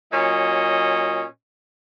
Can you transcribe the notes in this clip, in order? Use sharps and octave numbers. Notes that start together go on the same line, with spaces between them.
A#2 F#3 C#4 D#5